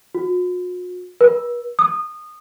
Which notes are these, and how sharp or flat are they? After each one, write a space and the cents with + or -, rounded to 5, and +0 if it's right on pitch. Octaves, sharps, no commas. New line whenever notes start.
F#4 -45
B4 -45
D#6 -25